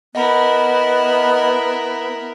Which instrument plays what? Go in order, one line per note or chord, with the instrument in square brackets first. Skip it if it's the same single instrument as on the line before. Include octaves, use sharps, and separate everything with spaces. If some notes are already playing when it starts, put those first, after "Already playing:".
[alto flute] B3 [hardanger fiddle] E4 A#4 [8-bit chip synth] D#5 F#5 B5